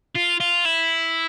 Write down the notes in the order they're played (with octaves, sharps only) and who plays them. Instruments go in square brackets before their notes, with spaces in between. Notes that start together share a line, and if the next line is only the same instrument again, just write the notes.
[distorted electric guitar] F4
F4
E4